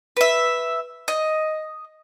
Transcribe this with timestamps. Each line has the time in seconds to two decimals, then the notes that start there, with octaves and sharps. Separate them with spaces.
0.17 B4 E5
1.08 D#5